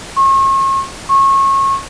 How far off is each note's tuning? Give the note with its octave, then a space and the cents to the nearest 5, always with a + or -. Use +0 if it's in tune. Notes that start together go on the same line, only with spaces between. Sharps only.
C#6 -40
C#6 -30